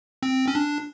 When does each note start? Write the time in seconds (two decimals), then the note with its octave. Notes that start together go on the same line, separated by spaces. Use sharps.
0.23 C4
0.48 C#4
0.55 D4